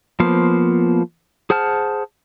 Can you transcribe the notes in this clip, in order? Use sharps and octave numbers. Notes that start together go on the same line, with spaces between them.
F3 A#3 B3 C5 F5
G#4 C5 F#5 A5 F6